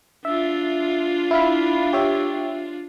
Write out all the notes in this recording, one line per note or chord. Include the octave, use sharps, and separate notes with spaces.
D4 F4 E5
E4 F5 B5
G4 C#5 E5